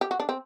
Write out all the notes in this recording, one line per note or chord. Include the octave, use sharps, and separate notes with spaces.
G4
F#4
D4
C4